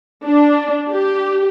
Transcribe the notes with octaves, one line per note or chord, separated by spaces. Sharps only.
D4
G4